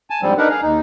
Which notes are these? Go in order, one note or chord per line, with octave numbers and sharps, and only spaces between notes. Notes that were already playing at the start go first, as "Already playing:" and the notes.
G#5 A5
G#2 D3 F3 G3 C4
D4 D#4 A#4 B4 F#5
G#4 F5
D#2 D#4